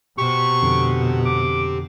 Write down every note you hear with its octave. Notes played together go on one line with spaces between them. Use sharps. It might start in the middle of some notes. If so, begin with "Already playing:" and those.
B2 G4 C5 C#6
F2 D3
D6